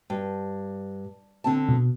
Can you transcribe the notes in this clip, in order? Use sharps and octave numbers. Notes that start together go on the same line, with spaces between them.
G2
D3 C4 A5
B2